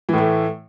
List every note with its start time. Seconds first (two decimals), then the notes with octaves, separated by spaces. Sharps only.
0.09 E3
0.13 A2
0.18 A3